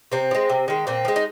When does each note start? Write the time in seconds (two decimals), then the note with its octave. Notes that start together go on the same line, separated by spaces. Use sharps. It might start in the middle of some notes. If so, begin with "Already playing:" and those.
0.12 C3 C4
0.31 F3
0.35 G#3
0.49 C3
0.68 D#3 G#3
0.87 A#2 C4
1.05 F3
1.08 G#3
1.16 D#4